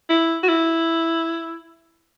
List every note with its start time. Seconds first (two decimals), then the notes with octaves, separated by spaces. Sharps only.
0.09 E4
0.43 F#4
0.48 E4